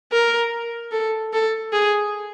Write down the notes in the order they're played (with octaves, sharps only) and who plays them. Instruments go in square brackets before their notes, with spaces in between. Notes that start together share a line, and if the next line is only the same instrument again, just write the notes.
[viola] A#4
A4
A4
G#4